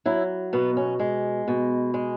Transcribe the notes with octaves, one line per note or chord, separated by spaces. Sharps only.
F#3 E4
B2 B3
C#4
G#3
B2
G#3